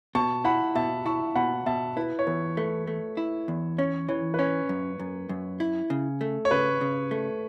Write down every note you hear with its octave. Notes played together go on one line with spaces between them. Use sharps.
B2 A5 C#6
E4 F#5 B5
B2 E5 A5
E4 A5 C#6
B2 F#5 B5
B2 E5 A5
E4 B4
C#5
E2 B4
A3 B4
A3
E4
E2
C#4 C#5
E3 C#5
B4
C#4 C#5
F#2
F#2
F#2
E4
C#3
A3
C#5
C#3 B4
C#3
A3